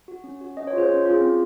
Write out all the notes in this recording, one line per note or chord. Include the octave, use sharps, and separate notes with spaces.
F#4
C#4
F#4
C#4 D#5
C#5
F4 G#4 C5
C#4
F4 G#4
C4